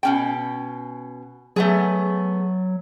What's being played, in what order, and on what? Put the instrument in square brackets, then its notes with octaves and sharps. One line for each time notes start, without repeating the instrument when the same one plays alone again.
[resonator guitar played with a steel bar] B2 C#4 G5
[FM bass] F#3 [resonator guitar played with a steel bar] A3 B3 G#4